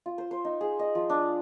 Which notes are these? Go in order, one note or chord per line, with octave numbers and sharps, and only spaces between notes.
F4
C5
C5
D#4
G#4
D#5
F3
D4